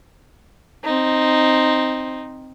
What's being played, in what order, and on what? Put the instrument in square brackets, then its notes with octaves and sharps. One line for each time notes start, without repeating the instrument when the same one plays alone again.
[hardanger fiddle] C4 D#4